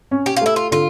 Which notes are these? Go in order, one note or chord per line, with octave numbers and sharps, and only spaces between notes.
C#4
G4
F4
A3 E4
F4
D3 F4